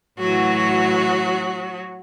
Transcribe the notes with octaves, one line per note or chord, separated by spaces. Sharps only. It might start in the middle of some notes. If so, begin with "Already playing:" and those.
A2 E3 F#3 F#4